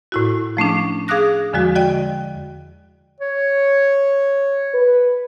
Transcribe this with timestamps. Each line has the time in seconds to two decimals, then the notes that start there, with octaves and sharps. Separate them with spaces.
0.12 A2 E4 F#4
0.57 F3 A3 C#4 D4
1.08 G#4 F5 D6 D#6 F#6 A#6
1.53 E2 D3 F3 G#3 F#4
1.76 F#4 D5 D#5 G5
3.20 C#5
4.74 B4